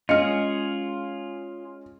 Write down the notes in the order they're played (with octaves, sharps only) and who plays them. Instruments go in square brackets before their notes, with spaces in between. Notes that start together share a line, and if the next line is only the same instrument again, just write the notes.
[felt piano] G#3 C#4 C#7 [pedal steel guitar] F4 G#4 [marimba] D#5 F6